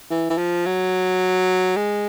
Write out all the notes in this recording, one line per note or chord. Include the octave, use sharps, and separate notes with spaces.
E3
E3
F3
F#3
G#3